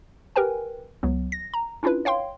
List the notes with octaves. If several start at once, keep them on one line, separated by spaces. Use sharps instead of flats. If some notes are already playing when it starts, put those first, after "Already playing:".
G4 A#4 B4 G5 G#5
C#2 F#3 B3
A#6
A#5
C#4 D4 E4 F4 B4
C#5 F5 G5 C6